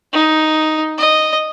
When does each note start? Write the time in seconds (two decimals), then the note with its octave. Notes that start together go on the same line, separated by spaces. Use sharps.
0.13 D#4
0.98 D#5